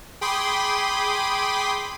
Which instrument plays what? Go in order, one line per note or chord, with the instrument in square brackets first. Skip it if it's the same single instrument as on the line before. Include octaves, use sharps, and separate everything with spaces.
[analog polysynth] G#4 G5 B5 C6 D6 D#6